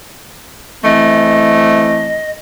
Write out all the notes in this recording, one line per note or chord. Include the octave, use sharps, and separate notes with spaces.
E3 A3 C4 D#5